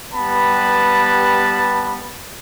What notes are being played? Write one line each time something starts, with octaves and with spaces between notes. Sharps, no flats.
G3 B3 G4 B4 A5 B5